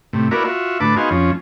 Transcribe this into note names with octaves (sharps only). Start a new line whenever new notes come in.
A2 C3
A#3 E4 F#4 A#4 B4 D5
F4 F#4 E5
A2 D3 B4 A5 D6
B3 D#4 F#4 G#4 C5 F5
F2 F3 C#4